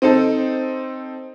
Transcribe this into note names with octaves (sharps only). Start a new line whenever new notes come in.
C4 D#4 A4